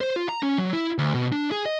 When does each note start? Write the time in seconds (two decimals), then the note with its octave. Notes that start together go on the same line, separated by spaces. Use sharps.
0.01 C5
0.16 F4
0.29 A#5
0.43 C#4
0.58 F#3
0.73 E4
0.98 D2
1.14 B2
1.32 D4
1.52 G#4
1.66 D#5